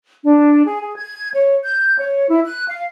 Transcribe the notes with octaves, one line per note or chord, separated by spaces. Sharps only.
D4
G#4
G#4
G#6
C#5
G6
C#5
E4
F#6
F5